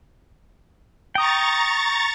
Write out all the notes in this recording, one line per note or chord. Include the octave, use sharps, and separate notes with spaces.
G5 A#5 C#6 D#6 A6